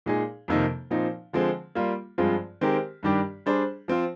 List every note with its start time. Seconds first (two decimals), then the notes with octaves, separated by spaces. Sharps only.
0.06 A#2 G#3 D#4 G#4
0.48 F2 C3 D#3 A#3 D#4
0.91 A#2 F3 C4 D#4
1.33 D3 F3 G#3 C4
1.75 G3 A#3 F4
2.18 G2 F3 G#3 C4 F4
2.61 D#3 G#3 C4 G4 A#4
3.03 G2 D#3 G3 D4 G4
3.46 G3 D4 G#4 C5
3.88 F3 C4 F4